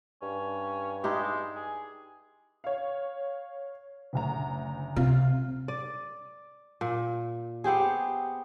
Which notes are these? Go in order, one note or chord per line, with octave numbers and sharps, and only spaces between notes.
G2 C#4
G#3 D#4 E4 G4
G#4
C#5 F5
F#1 D2 A#5
C3 F4
D5
A#2
B3 C4 G4 G#4